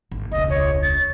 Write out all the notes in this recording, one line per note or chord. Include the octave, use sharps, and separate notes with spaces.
G#1
E1 C#2 D#5
C#5
A6